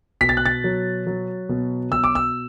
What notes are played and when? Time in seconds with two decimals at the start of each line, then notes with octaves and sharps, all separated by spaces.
0.21 B2 B6
0.29 A6
0.37 F#6
0.46 A6
0.64 F#3
1.07 F#3
1.49 B2
1.92 B2 E6
2.04 D6
2.15 E6